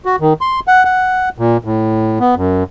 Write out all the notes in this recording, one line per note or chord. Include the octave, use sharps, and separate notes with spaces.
F#4
D#3
C6
F#5
F#5
A#2
A2
B3
F#2